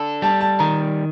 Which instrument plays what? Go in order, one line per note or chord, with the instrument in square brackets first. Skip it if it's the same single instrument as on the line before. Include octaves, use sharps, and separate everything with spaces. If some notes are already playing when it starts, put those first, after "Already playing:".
Already playing: [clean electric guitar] D4 A4
[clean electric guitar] G3 [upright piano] A5
[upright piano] A5
[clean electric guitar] D#3 [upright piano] A#5